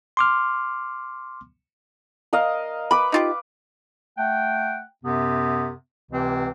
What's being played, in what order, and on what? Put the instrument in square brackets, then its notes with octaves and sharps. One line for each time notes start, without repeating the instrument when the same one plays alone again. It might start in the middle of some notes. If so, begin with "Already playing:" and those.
[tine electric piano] C6 D6 F6
[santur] A#4 D#5 F5
[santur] B4 D6 [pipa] B5
[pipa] D#4 F4 G4
[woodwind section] A3 F#5 G5
F#2 C3 B3
C#2 C3 E3 C4